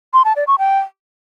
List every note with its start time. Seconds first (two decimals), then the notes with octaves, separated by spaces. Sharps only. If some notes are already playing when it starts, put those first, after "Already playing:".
0.13 C6
0.25 A5
0.36 D5
0.47 C#6
0.59 G5